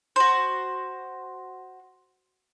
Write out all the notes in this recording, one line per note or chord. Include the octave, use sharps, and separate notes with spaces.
F#4 C5